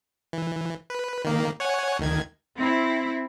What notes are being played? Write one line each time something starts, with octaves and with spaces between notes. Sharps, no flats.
E3
B4
D#3 A#3
C#5 F#5 G#5
D2 D#3 G#6
C4 E4